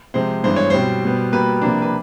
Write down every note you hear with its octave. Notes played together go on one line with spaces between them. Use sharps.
C3 F3 G#3 C5
G2 E3 G#3 B3 D4 C5
C#5
B2 G3 C4 C5
B2 G3 B3
B2 G3 A#3 B4
C3 F3 A#3 D4
B4